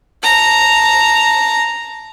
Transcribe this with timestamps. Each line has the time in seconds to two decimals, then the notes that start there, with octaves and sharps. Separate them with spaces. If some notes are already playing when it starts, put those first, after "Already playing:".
0.23 A5 A#5